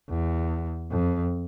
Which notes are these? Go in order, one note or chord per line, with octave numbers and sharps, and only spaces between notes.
E2
F2